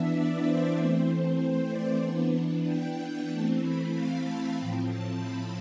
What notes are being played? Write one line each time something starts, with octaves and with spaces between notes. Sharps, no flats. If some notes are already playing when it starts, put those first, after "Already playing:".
Already playing: E3 B3 D4 E5
D5
C5
E3 A3 C4 C5
D5
E3 B3 D4
G5
E3 A3 C4 A5
B5
F5
A5
A2 F3 C4 G5
A5
B5